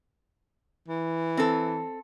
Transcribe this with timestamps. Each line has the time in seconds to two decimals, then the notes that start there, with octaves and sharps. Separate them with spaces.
0.88 E3
1.37 C4 A4